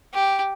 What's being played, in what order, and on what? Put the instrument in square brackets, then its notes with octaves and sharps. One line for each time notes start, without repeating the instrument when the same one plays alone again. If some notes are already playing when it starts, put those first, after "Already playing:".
[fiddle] G4